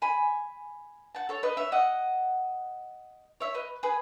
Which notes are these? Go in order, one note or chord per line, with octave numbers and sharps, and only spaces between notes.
G#5 B5
F#5 A5
A4 C#5
B4 D#5
C#5 E5
D#5 F#5
C#5 E5
B4 D#5
G#4 B4